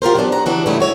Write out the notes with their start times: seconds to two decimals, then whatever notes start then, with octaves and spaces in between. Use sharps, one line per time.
0.02 F4 G4 A#4 C5
0.15 D3 F#3 B3 D4 G4
0.32 G2 F#5 A#5
0.46 C#3 E3 D4 F#4
0.66 G#2 C#3 E3 G3 A3 E4
0.80 F#4 C#5 E5